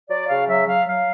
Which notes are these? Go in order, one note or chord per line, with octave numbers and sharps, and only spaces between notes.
F#3 D5
C#3 F5
F#3 E5
F#3 F5
F#3 F5